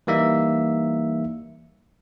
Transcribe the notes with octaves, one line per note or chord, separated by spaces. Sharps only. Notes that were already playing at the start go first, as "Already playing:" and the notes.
E3 G3 A#3 D#4 E5